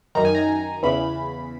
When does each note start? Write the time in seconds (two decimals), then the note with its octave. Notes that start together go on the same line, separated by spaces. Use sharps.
0.15 F#2 D#3 A#5
0.25 G#5
0.35 A#5
0.83 E2 C#3 E3 B5